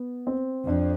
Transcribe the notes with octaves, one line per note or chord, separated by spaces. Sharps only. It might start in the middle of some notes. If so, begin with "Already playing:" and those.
Already playing: B3
C4
F2 D4